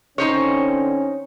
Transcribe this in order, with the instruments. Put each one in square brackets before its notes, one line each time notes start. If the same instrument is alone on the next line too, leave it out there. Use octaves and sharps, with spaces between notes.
[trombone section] D3 C4 C#4 [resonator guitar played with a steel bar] D#4 C5 C#5